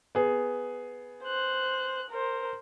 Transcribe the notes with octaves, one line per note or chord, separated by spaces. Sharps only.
B3 G#4
C5 F#6
A#4 C5